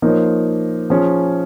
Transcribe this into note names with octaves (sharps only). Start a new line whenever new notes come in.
F3 A#3 D#4 C#5
F3 C#4 G#4